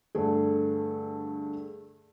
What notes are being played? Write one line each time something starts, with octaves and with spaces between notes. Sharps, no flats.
G2 D3 A3 G#4